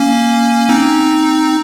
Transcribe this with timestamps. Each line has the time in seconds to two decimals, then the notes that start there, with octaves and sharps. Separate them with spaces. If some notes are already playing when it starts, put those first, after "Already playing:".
Already playing: A#3 C#4
0.69 C4 D#4